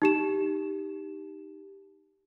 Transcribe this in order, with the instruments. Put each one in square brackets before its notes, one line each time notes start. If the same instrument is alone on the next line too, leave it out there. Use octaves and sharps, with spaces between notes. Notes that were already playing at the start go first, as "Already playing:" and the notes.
[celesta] D#4 G4 E7